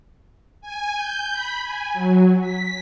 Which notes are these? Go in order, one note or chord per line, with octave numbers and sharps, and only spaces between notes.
G#5
G6
B5
G#5
F#3
B6